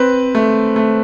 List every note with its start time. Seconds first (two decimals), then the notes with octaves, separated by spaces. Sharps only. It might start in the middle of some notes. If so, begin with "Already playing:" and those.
Already playing: C4 B4
0.35 A3
0.76 A3